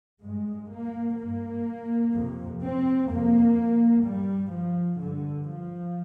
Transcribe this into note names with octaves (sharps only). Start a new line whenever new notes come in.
G2 G#3
A#3
G2 A#3
F2 C3
C4
F2 C3 A#3
G2 G3
F3
G2 D3
F3